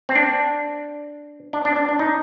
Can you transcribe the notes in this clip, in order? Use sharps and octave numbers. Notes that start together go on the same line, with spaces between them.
C4
D4
D4
D4
D4
D4
D#4